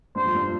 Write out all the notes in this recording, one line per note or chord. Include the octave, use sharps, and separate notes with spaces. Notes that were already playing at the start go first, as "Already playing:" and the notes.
G2 C5
F2
G2
A#2